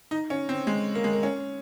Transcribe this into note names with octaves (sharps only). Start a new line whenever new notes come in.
D#4
C#4
C4
G#3
A#3
G#3
A#3
C#4